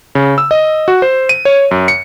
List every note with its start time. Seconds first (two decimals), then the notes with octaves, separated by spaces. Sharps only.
0.15 C#3
0.38 E6
0.51 D#5
0.88 F#4
1.02 C5
1.29 D#7
1.45 C#5
1.71 F#2
1.88 C#7